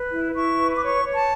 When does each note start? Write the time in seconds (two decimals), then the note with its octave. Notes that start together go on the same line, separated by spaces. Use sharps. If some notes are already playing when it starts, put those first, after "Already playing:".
Already playing: B4
0.11 E4
0.35 E4 C#6
0.58 B4
0.73 D6
0.82 C#5 C#6
1.05 C#5
1.13 A5